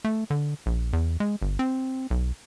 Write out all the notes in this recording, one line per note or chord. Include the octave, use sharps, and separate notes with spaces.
A3
D3
A#1
E2
G#3
G1
C4
B1